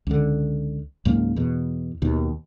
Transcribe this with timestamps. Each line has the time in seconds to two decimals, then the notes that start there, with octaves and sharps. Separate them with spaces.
0.07 C#2 D3
1.05 C#2 G#2 F#3 A#3
1.36 E2 B2
2.02 D#2 B2